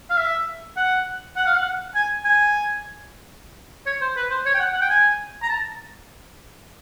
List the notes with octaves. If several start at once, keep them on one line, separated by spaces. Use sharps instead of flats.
F5
E5
F#5
F#5
F5
F#5
G#5
G#5
C#5
C5
B4
C5
C#5
G5
F#5
F#5
G5
G#5
A#5
A5